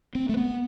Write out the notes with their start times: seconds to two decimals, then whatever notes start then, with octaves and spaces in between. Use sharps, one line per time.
0.15 C4
0.29 A3
0.37 B3